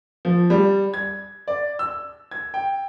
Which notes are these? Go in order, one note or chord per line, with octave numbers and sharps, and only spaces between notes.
F3
G3
G#6
D5
E6
G#6
G5